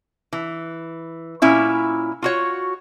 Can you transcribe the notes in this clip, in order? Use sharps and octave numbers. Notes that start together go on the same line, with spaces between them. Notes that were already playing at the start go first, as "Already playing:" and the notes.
E3
A#2 C#4 E4 E5
F4 F#4 C#5